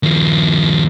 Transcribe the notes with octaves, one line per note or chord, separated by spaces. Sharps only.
D#2 F3